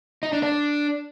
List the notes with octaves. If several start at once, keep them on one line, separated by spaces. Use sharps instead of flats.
D#4
D4
D4